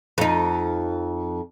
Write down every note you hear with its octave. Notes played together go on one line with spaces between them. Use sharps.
F2 D#4